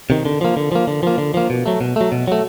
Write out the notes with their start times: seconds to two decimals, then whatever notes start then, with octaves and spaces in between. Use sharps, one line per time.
0.10 C3 D#3
0.25 D3
0.41 F3 A#3
0.57 D3
0.72 F3 A#3
0.87 D3
1.03 F3 A#3
1.18 D3
1.34 F3 A#3
1.50 B2
1.66 F#3 A3
1.81 B2
1.96 F#3 A3
2.12 B2
2.28 F#3 A3